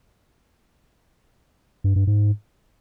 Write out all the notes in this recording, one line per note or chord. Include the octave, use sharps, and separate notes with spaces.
G2
G2
G#2